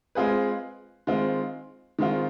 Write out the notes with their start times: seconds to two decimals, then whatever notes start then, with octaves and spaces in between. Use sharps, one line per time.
0.15 G#3 C4 F4 G#4 B4
1.07 D#3 G#3 C4 F4
1.99 D#3 G#3 C4 F4